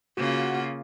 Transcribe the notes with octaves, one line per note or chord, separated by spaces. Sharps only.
C#3 A#3 F4 F#4